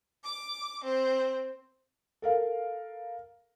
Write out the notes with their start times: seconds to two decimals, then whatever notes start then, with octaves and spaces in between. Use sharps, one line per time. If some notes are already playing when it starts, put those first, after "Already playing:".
0.24 D6
0.83 C4
2.22 A4 A#4 F5